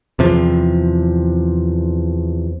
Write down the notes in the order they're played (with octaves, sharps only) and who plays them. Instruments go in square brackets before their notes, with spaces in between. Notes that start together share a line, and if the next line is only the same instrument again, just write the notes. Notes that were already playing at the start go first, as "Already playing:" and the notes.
[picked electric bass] E2 C3 F3